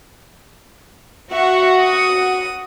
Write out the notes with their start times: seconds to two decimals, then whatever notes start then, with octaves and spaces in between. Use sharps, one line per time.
1.32 F#4 E5 C#6
1.83 D#6